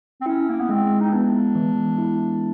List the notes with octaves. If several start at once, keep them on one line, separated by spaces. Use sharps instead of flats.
C4
C#4 E4
A#3
B3
G#3 C4
D#4
B3 D4
E3
E4